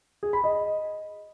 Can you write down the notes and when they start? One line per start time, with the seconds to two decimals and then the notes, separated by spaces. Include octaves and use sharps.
0.23 G#4
0.33 B5
0.44 D#5